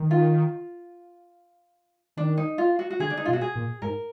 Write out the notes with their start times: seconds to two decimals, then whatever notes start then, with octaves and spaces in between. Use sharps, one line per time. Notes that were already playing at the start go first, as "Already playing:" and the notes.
Already playing: D#3
0.11 F4
2.17 D#3 D4
2.37 D#4
2.58 F4
2.79 F#4
2.91 F#4
3.00 D3 G#4
3.10 D4
3.17 D#4
3.26 B2 F4
3.33 F#4
3.41 G#4
3.55 A#2
3.82 G#2 A#4